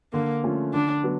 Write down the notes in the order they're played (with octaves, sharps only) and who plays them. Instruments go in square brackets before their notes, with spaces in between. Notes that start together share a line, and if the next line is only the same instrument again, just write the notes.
[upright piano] D3 [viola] A#3
[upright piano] F3 A3 C#4 F4
[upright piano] D3 [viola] D4
[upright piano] F#3 B3